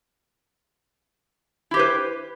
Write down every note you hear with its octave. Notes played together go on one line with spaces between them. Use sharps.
E4 G4 B4 C5